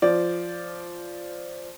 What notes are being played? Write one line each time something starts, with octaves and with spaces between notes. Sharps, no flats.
F3 D5